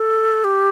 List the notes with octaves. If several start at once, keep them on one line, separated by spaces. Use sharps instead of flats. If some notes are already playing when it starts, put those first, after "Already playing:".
Already playing: A4
G4